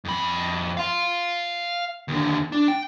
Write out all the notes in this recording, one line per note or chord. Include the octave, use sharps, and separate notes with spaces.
F2 B5
F5 C6
D#2 D3
D4
G5